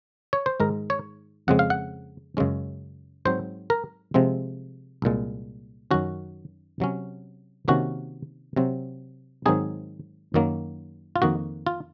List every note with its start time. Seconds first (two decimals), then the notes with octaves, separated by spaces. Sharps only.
0.33 C#5
0.46 C5
0.60 G#2 D#3 G#3 A#4
0.90 C#5
1.48 F2 C#3 G#3 C4 F#5
1.59 F5
1.70 F#5
2.37 F#2 C#3 G#3 C#4
3.25 G#2 F#3 C4 C5
3.70 A#4
4.14 C3 F3 G#3 C4
5.02 C2 A#2 G#3
5.91 F#2 D#3 F#3 C#4 F#4
6.80 C3 F#3 C#4
7.68 C3 D#3 A#3 C#4 F#4
8.56 C3 F#3 C4
9.46 G#2 D#3 F#3 C4 D#4 G#4
10.34 F#2 D#3 F#3 A#3
11.16 F4
11.22 F2 D#3 A#3 D#4 F#4
11.67 F4